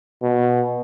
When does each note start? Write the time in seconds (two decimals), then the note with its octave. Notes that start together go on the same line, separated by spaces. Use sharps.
0.23 B2